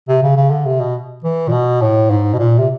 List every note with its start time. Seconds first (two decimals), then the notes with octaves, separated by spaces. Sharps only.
0.08 C3
0.23 C#3
0.36 C#3
0.51 D3
0.66 C3
0.81 B2
1.24 E3
1.48 A#2
1.52 B2
1.82 A2
2.10 G#2
2.34 B2
2.38 A#2
2.58 C3